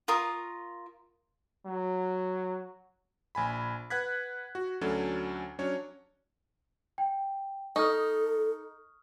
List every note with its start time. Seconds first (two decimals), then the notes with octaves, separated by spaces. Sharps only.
0.08 F4 A#4 C#6 D#6
1.65 F#3
3.35 A#1 G#5 B5
3.90 B4 F#5 F#6 G#6 B6
4.55 F#4
4.81 D2 F#3 C#4 D4 A4
5.59 F#3 C#4 D4 C#5
6.98 G5
7.76 D#4 A4 C#6 D#6 F6